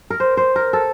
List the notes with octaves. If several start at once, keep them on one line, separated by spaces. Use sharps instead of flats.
A#4
C5
C5
A#4
A4